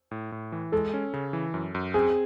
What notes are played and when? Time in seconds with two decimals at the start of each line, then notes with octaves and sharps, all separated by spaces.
0.11 A2
0.32 A2
0.52 E3
0.72 G#3 A4
0.94 C#4
1.14 C#3
1.33 E3
1.54 F#2
1.75 F#2
1.94 C4 G#4